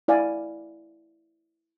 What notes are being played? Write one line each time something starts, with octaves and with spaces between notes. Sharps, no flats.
E4 D5 F5 G#5